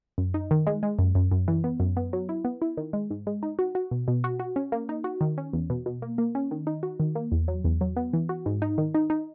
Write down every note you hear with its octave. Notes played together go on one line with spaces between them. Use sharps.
F#2
D#4
D#3
G#3
G#3
F#2
F#2
F#2
E3
B3
F#2
B3
F#3
E4
B3
E4
D#3
G#3
G#2
G#3
D#4
F#4
F#4
B2
B2
F#4
F#4
C#4
A#3
D#4
F#4
D#3
C#4
E2
B2
B2
A#3
A#3
C#4
D#3
D#4
F#4
D#3
A#3
E2
F#3
E2
F#3
B3
E3
F#4
G#2
D#4
D#3
D#4
D#4